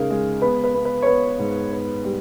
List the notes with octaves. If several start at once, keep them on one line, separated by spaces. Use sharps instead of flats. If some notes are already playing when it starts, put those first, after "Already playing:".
Already playing: C#3 G#3 C#4 D#4 G#4 A#4
G#3
B3 B4
B4
B3
B4
C#5
B3 B4
G#2
B3
G3